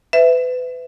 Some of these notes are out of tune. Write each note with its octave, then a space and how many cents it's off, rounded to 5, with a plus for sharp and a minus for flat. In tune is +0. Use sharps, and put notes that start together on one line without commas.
B4 +30 E5 +0